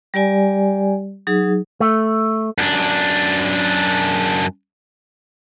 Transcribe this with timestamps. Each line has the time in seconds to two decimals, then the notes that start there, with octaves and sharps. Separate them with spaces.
0.14 G3 G4 D5 G#5
1.27 F#3 D#4 G#4
1.80 A3
2.58 F#2 D4